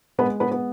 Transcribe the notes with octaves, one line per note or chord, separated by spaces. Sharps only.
G#3 B3 B4
B3 B4
B3